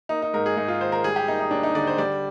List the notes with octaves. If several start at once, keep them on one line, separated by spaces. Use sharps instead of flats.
A#3 D#4
D#4
G#2 A#4
G#4
G#2 D#4
F4
D#3 C5
A#4
G3 G#4
G4
A#3 D#4
D#4
D#2 D4
D#4
D3 D5
C5
G3 D5